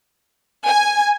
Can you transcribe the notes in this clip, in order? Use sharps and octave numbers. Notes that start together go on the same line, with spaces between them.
G#5